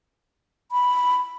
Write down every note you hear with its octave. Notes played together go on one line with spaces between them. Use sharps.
B5